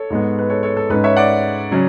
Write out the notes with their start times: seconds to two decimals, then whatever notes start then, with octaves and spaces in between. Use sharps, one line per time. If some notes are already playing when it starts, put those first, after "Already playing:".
Already playing: A4 C#5
0.10 G#2 G#3 B3
0.39 B4
0.50 A4 C#5
0.63 A4 C#5
0.77 A4
0.90 G#2 G#3 C#4 B4
1.04 C#5 E5
1.17 D5 F#5
1.71 C#3 F#3 C#4